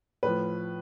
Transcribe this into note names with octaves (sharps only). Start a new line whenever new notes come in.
A2 F3 B4